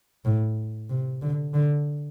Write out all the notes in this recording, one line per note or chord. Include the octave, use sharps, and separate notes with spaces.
A2
C3
D3
D3